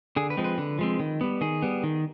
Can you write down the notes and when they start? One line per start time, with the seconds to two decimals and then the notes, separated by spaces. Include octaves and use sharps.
0.16 D3 G#4
0.30 B4
0.37 F3 G#3 C4
0.44 B4
0.58 D3
0.79 F3 G#3 C4
1.00 D#3
1.21 G3 B3
1.41 D#3 G#4
1.62 G3 B3
1.83 D#3